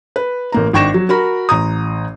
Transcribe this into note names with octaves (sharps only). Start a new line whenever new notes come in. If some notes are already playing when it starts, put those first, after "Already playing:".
B4
A1 A#3 A#5
G#1 D4 G5 C#6 A#6 E7
F#3
F#4 A#4 B5
A1 A#5 D#6